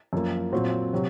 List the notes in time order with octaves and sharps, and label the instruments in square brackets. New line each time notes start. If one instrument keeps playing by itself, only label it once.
[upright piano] F#2 F3 A#3
A#2 F#3 C4 F#4
C3 F#3